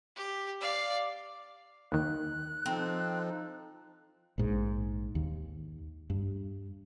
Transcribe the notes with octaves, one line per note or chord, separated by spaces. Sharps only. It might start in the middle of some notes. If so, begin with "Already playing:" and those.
G4
D5 F5
D#2 D#3 F#6
F3 C4 D#4 A4
A#1 G#2
D#2
G2